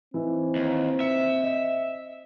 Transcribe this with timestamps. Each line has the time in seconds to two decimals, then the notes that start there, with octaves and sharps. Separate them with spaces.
0.14 E3 C4 D#4
0.56 D#2
1.00 E5 C#7
1.44 D#5